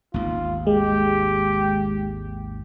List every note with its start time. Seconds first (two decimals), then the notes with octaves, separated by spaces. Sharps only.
0.14 G#1 D#2 F4
0.67 G#3 G4